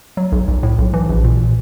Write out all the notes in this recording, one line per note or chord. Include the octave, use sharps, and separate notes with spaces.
F#3
B1
B1
A2
B1
E3
A#1
A#2